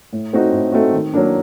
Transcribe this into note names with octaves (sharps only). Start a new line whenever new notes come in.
A2
A3 C4 D#4 F#4
A2
A3 C4 D#4 F#4
D#3
F#3 A#3 D4